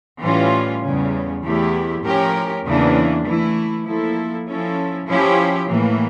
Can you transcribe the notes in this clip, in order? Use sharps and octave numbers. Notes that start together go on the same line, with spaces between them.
A2 E3 G3 C#4 F4
E2 C#3 G3 C#4
E2 E3 A3 E4 G4
A2 F3 C#4 G4 A#4
E2 C#3 E3 A#3 D4
E3 A3 E4
F3 A#3 E4 A4
F3 C#4 E4 A4
F3 C#4 E4 G4
A2 E3 A#3